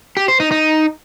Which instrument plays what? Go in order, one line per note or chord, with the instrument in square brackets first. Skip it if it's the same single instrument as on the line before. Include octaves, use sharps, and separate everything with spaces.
[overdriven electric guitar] G4
C5
D#4
D#4